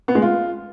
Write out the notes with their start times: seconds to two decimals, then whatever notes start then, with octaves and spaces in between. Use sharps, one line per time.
0.08 B3
0.15 G#3
0.22 F4